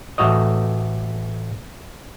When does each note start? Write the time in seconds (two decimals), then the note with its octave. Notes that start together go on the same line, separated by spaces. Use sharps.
0.18 A1 A3 F#4 C#5 D#5